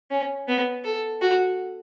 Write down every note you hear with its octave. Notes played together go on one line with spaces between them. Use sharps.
C#4
B3
A4
F#4